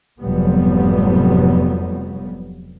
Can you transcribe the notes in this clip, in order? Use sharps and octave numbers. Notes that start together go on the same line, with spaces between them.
F1 F2 G#2 F#3 G3 B3